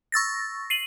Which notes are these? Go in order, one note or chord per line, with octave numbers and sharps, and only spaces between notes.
C#6 E6 A6 A#6
C7 D#7 F#7